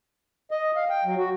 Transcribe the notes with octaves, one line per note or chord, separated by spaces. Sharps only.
D#5
F5
G5
F#3
F#4